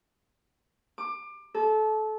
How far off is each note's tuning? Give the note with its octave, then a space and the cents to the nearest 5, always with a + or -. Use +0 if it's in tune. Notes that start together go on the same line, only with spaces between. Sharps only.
D6 +25
A4 -25